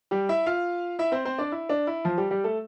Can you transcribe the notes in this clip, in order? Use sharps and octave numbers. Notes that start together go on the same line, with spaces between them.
G3 G4
E4 E5
F4 F5
E4 E5
C4 C5
C4 C5
D4 D5
E4
D4
E4
F3 F4
G3 G4
G3 G4
A3 A4